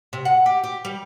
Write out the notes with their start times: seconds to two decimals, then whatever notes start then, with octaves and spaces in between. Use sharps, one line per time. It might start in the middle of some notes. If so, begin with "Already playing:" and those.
0.13 C3
0.25 F#5
0.46 G4
0.64 G4
0.85 G3